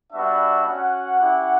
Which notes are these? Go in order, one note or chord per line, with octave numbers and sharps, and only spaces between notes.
G3 B3 D4 F#4 E5
C#4 F#4 F#5
C#4 E4 G4